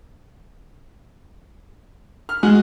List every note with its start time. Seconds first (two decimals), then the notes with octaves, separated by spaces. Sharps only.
2.29 F6
2.43 G#3 F#4